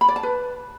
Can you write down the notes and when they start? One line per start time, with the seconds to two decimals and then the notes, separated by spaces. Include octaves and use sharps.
0.01 B5
0.08 D5
0.16 A5
0.23 B4